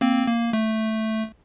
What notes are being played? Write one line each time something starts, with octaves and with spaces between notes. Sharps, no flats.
A#3 C4
A#3
A3